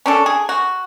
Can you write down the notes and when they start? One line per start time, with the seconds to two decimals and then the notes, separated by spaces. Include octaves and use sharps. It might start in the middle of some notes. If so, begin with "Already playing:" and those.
0.06 C#4 D4 A4
0.26 G#4
0.49 F#4